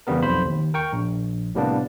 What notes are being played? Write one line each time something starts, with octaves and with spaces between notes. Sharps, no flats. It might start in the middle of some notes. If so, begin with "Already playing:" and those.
E2 C#3 G3 B3 A#4
B1 F2 C5 B5
D#2
A#4 G5 C#6
A#1
A2 C3 G3 A#3 B3 D4